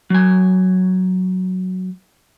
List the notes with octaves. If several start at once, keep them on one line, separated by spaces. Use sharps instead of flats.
F#3 G#5